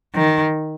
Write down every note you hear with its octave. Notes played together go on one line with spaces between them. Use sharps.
D#3